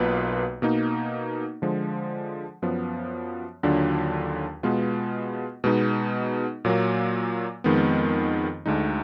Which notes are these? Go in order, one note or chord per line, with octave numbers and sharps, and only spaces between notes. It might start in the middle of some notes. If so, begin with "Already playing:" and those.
Already playing: B1 B2 A#3 F4 B4
B2 A#3 D#4
D3 F3 G#3
F#2 F3 B3
D#2 D3 F#3 D4 F4
B2 G#3 B3 F4
B2 G#3 B3 D#4
A#2 F#3 A#3
F2 D#3 G#3 B3
D2 D3 G#3 D#4